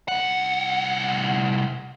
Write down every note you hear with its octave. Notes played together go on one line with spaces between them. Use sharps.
C2 F#5